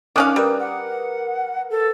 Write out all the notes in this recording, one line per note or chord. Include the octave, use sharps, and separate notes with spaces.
D#3 C#4 F5 D6 D#6 F#6
G3 A#4 B4 F6
F#5
A4